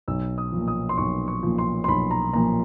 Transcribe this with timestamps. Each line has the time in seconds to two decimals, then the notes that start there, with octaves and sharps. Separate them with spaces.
0.08 B1 E6
0.38 D#6
0.52 A#2 F3
0.68 D#6
0.89 C6
0.98 B1 C#6
1.28 C#6
1.43 A#2 F3
1.58 C6
1.84 C6
1.88 B1 B5
2.11 A#5
2.33 A#2 F3 A#5